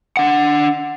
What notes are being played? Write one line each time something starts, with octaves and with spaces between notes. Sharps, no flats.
D4 F#5